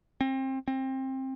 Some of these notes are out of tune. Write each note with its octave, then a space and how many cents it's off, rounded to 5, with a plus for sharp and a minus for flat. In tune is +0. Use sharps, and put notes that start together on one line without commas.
C4 +25
C4 +20